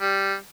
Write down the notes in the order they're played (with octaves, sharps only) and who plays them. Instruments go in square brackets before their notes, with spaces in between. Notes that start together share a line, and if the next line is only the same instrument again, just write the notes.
[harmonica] G3